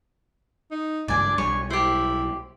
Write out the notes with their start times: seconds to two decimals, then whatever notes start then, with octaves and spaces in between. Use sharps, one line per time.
0.71 D#4
1.08 G#1 C#2 G2 D4 D5 G#5
1.38 B1 G3 C#5 G#5 C#6
1.71 E4 G4 C5